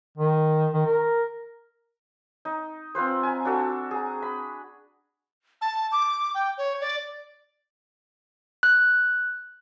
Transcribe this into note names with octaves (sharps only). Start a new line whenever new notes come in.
D#3
D#3
A#4
D#4
C4 F4 B4 C5
G#5 A#5
D4 F#4 A4
G#4 A#5
B5
A5
D6
G5
C#5
D5
F#6